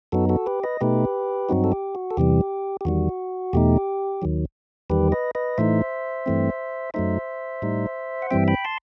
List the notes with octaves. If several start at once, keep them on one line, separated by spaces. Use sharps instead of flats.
F#2 F#3 B3 D#4 F#4 A4
F#4 A4
G4 B4
B4 D#5
B2 A3 D#4 G4 B4
G2 F#3 C4 D#4 F#4
A4
G4
F#4
A4
E2 C3 E3 G3 G4
G4
E2 D#3 G3 F#4
E2 B2 A3 D#4 G4
D#2 D#3 F#3
E2 D#3 G3 G4 B4
B4 D#5
B4 D#5
A2 E3 A3 D#4 C5 E5
G2 E3 A3 C4
F#2 F#3 A3 D#4 C5 E5
A2 G3 D#4
F#5
G2 E3 G3 C4 E5 G5
G5 B5
A5 C6